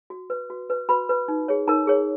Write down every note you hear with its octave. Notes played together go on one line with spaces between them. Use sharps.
F#4
B4
F#4
B4
F#4 B4 B5
B4
D#4
G#4 C#5
D#4 A#4 A#5
G#4 C#5